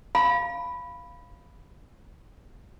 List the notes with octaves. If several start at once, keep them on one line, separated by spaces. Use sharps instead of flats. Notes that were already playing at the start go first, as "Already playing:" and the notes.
F5 B5